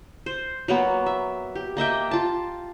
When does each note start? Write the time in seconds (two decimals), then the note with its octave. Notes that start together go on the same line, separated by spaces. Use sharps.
0.26 C5
0.68 F#3 A#3 B3
1.06 E5
1.55 G4
1.77 A#3 D#5 E5 G5
2.11 F4 A5